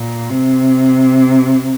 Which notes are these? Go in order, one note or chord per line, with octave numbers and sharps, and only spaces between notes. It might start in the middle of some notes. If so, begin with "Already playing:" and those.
Already playing: A#2
C3